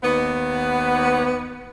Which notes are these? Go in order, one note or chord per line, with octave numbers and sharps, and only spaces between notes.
D#2 B3